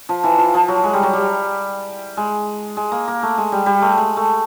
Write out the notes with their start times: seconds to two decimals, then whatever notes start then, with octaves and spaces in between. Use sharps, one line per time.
0.09 F3
0.24 E3
0.38 F3
0.54 F3
0.68 F#3
0.84 G#3
0.93 G3
1.03 F#3
1.13 G3
2.17 G#3
2.77 G#3
2.92 A#3
3.08 A#3
3.23 A3
3.38 G#3
3.52 G3
3.66 G3
3.82 A3
3.97 G#3
4.17 A3